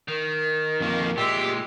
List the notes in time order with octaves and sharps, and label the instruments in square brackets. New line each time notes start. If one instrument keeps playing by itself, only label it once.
[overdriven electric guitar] D#3 [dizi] A#4
[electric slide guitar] F2 A#3
[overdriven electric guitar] A#2 G#3 [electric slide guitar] G4 [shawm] E5